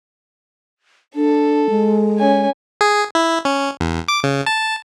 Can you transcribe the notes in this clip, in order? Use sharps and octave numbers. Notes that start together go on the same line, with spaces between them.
D4 A4
G#3
C#4 G#5
G#4
E4
C#4
E2
D6
C#3
A5